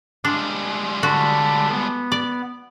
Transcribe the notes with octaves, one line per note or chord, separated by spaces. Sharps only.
G3 G#3 D4
D3 F#4 A5 B5
B3
D5